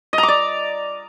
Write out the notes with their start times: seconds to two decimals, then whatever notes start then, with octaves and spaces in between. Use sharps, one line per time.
0.13 D#5
0.18 A#5
0.23 D6
0.28 D5